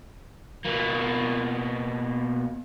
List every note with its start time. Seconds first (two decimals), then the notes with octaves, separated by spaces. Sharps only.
0.65 B2 A#3